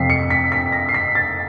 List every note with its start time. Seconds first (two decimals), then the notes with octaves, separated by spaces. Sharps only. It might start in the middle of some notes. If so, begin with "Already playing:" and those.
Already playing: F2 C3 F3 B6 C7
0.10 C#7
0.30 B6
0.52 B6
0.72 A#6
0.89 C7
0.94 B6
1.15 A6